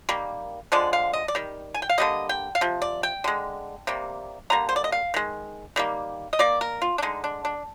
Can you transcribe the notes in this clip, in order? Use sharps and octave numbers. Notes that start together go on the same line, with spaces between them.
D#3 G3 A#3
D3 F3 G#3 D5
F5
D#5
D5
D#3 G3
G#5
G5
F5
D3 G3 A#3 D#5
G5
F5
C3 F3
D5
G5
D3 G#3
C3 G3 A#3
D3 G3 A#3 A#5
C5
D5
D#5
F5
D#3 G#3
D#3 G3 A#3
D#5
D#3 A#3 D5
A#4
F4
D4
D3 G#3 D#4
D4
D4